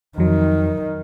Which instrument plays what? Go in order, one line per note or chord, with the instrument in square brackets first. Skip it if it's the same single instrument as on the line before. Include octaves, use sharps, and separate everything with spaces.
[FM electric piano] F2 F#3 [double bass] D#3